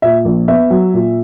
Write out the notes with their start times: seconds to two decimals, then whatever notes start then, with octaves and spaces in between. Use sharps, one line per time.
0.02 A#2 E5
0.25 A#1
0.48 B3 E5
0.70 F#3
0.94 A#2